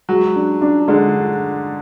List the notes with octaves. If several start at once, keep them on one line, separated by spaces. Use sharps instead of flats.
F#3 G#3
D4
D4
D3 G#3